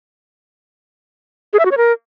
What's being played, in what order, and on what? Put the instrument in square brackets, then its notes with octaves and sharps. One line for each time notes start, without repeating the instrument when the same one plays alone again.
[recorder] G#4
E5
F#4
C#5
A#4